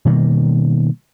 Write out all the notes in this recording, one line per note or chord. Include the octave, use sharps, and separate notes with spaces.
B2 D#3 G3 A#3